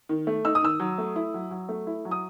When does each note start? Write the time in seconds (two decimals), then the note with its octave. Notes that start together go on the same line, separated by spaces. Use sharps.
0.09 D#3
0.27 A3
0.45 D#4 E6
0.55 D#6
0.62 D#3 E6
0.80 F#3
0.98 A3
1.16 E4
1.34 F#3
1.51 F#3
1.69 A3
1.87 E4
2.05 F#3
2.11 D#6